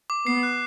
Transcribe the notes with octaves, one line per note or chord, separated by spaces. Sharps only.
D6
B3 C7
F#6